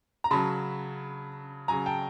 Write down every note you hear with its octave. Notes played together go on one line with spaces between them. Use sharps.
A#5
C#3 F#3 A5 B5
C#3 F#3 G#5 A#5
G5 A5